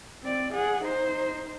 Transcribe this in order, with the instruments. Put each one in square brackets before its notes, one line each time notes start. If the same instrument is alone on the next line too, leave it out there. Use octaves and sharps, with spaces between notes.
[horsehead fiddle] C4 D5
G#4 F#5
D#4 C5